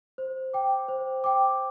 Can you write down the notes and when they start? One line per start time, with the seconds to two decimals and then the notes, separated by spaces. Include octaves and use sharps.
0.18 C5
0.53 G5 D6
0.88 C5
1.24 G5 D6